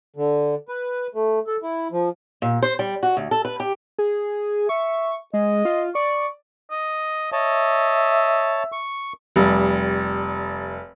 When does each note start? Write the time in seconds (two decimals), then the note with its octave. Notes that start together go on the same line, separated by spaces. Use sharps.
0.16 D3
0.68 B4
1.15 A3
1.47 A4
1.62 E4
1.92 F3
2.42 A#2
2.62 C5
2.79 G3
3.03 F#4
3.17 D2
3.31 A4
3.45 B4
3.60 G4
3.99 G#4
4.69 E5 C#6
5.34 G#3 D#5
5.65 F4
5.95 D5 C#6
6.71 D#5
7.32 C#5 D#5 E5 A5
8.72 C#6
9.36 F1 G3